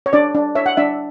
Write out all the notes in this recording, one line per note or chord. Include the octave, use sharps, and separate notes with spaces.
C#5
D4 D5
D4
C#5 E5
F#5
D4 E5